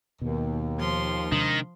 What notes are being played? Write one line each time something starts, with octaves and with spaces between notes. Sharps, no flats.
D#2 B2
F3 C6
C3 D#3 G#3 D4